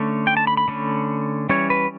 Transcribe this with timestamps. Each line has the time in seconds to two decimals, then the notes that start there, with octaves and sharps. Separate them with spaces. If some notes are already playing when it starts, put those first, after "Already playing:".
Already playing: D3 A3 C#4
0.27 G5
0.37 A5
0.47 B5
0.57 B5
0.68 D3 A3 C#4
1.49 E3 G3 C#4 C#5
1.70 B4